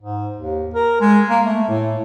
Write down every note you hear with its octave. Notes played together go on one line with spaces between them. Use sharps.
G#2
D#2
A#4
G#3
A#3
A3
A2